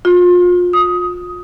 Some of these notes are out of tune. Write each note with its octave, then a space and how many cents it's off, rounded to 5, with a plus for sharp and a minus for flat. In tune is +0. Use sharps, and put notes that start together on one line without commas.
F4 +30
D#6 +10